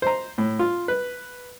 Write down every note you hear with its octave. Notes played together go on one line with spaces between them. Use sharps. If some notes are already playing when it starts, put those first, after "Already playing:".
C5 A#5
A2
F4
B4